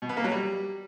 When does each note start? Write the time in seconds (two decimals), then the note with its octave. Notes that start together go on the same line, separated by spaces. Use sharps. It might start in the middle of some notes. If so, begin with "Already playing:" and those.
0.02 B2
0.09 B3
0.17 A#3
0.24 F#3
0.32 G3